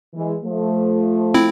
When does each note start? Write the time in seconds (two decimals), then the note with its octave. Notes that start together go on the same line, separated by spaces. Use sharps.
0.14 E3 G#3
0.44 F3 A3
1.34 C4 E4